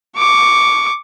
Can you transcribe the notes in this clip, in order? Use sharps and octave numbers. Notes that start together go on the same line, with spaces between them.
C#6 D6